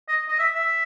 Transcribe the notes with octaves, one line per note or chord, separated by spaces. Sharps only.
D#5
D#5
E5
E5